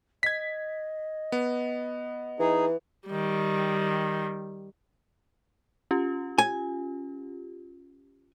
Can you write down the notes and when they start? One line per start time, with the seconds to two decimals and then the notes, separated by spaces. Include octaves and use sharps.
0.23 D#5 G#6 B6
1.32 B3
2.40 E3 D#4 G#4
3.08 D#3 G3
5.91 C#4 F4 G4
6.38 G#5